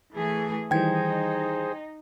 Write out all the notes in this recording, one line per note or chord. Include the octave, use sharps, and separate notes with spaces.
E3 A3 G#4
D#3 E3 G3 D#4 G#4 C5 G5 G#6